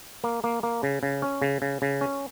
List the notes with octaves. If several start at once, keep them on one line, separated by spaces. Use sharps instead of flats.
A#3
A#3
A#3
C#3
C#3
C#4
C#3
C#3
C#3
C#4